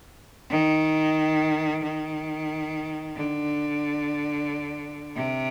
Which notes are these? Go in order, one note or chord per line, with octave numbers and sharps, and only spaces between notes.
D#3
D#3
D3
C3